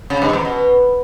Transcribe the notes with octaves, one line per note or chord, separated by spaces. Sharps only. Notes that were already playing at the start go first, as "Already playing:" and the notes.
C#3
G2
E2
B2